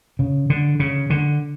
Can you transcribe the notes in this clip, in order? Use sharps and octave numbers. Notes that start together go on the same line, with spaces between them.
C#3
D3
C#3
D3